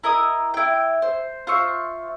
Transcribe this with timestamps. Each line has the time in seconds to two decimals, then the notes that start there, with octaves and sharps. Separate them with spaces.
0.04 E4 A#4 D#5 D#6
0.54 E4 G5
1.02 C5
1.47 F4 C5 E5 C#6